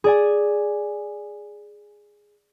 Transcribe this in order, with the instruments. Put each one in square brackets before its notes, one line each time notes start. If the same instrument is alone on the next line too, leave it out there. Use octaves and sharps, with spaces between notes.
[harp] G#4 D5 G#5